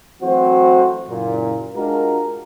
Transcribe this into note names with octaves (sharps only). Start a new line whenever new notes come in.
E3 F#3 A3 C4 F#4 C5
F#1 A#2
G#3 D4 F4 F#4 A#4